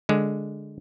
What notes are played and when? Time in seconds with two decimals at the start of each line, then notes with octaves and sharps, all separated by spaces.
0.09 D3 G#3